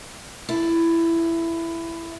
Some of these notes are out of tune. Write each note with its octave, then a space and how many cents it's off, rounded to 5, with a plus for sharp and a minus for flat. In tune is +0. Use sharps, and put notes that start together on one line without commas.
E4 +15 A4 +0